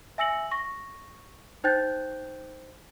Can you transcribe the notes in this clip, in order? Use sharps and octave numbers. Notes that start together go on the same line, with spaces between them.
E5 G#5 E6 A#6 C#7 F#7
C#6 A#6
D#4 C5 G5 F#6 G6 A6